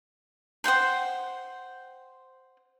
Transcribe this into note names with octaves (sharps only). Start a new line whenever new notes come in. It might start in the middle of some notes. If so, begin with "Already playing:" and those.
C5 F#5 G5 C6